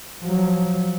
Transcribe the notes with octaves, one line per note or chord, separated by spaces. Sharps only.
F3 F#3